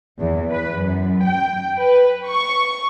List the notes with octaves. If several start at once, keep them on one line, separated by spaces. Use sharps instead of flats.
E2
B4
F#2
G5
B4
C#6